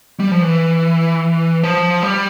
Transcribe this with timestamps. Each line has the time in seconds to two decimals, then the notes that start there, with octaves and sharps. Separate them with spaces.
0.20 G3
0.31 F3
0.42 E3
1.63 F3
2.03 G3